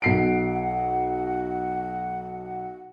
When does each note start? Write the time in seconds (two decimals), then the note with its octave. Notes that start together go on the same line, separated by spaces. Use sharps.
0.02 B1 F#5 C7 D7